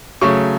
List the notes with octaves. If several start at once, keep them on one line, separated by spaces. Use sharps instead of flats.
C#3 F#3 A3 C#6